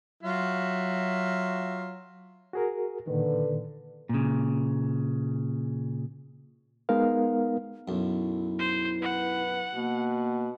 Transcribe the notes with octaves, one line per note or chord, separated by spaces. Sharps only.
F#3 F4 F#4 E5
F#4 G#4 A#4
A#2 D3 D#3 B4
A#2 C#3
G#3 B3 D#4 A#4 F5
B1 F#2 E4
C5
B4 F#5
B2 A#3